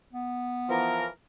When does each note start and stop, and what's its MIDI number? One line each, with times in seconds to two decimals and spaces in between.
0.13 1.06 59
0.69 1.06 52
0.69 1.06 53
0.69 1.06 70